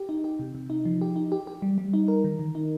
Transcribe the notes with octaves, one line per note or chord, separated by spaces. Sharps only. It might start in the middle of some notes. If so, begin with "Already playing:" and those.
Already playing: G4
D#4
G4
C3
C3
D#4
F3
G4
D#4
G4
G4
G3
G3
D#4
A#4
D#3
D#3
D#4